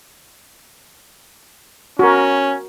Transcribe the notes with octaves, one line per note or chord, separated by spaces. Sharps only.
C#4 F#4 A#4